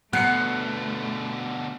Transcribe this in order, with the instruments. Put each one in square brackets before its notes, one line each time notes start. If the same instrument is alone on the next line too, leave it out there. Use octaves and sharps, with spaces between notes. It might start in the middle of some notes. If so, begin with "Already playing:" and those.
[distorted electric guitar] B2 D3 [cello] A3 [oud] B3 [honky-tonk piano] F#6 C7 C#7